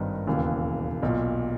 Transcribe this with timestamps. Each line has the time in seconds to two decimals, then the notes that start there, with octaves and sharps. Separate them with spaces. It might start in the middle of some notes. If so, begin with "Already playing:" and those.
Already playing: G#1 G2 D#3 B4
0.27 E1 D#2 C#3 E3
1.03 B1 A#2